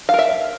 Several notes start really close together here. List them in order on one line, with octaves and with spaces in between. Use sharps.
F5 A#4 E5